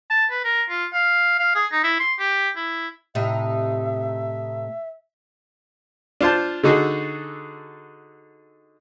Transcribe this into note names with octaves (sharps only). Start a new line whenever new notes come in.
A5
B4
A#4
F4
F5
F5
G#4
D#4
E4
C6
G4
E4
A2 C3 D#4 E5
D4 F4 C5 A5
D3 D#4 F#4 G#4 A4